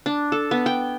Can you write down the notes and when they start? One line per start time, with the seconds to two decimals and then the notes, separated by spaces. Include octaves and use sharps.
0.06 D4
0.32 A4
0.51 B3
0.66 G5